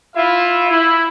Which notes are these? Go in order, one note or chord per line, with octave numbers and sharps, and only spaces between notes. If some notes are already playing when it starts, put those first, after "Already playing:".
E4 F4 E5
E4